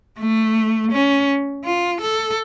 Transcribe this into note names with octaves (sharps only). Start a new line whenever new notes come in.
A3
C#4
F4
A4